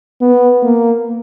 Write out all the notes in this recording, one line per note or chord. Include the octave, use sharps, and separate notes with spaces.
B3
A#3